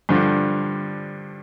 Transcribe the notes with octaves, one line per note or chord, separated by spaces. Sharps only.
G2 D3 F3